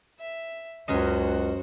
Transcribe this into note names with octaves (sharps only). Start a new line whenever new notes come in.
E5
C#2 F#2 C#4 F#4 C5 D#5